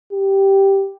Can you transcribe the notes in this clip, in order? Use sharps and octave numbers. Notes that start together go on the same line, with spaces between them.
G4